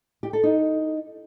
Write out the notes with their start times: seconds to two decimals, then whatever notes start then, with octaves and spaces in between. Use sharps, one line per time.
0.23 G4
0.33 A4
0.43 D#4